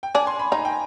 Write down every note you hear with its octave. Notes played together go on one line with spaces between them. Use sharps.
G5
D4 G#5
C6
B5
D#4 A#5
G5